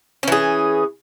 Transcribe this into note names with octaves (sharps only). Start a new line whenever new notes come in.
E3 C#4 G#4